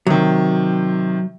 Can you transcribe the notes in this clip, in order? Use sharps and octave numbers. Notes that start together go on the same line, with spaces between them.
C3 D#3 F#3